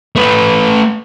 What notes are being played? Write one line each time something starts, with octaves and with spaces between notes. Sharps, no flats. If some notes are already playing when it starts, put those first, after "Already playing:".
A3 B4